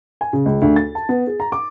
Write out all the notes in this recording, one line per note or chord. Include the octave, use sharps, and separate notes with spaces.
G#5
C#3
C#2
D2
A6
A5
B3
G#4
A#5
D6